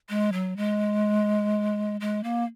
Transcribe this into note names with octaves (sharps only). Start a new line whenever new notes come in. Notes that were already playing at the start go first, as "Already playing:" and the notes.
G#3
F#3
G#3
G#3
A#3